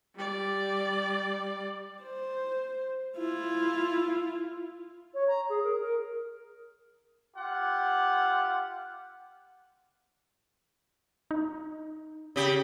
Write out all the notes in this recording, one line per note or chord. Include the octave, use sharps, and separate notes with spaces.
G3 D5
C5
E4 F4
C#5
A#5
G#4
A#4
A#4
F4 G4 F#5
D#4
C#3 G4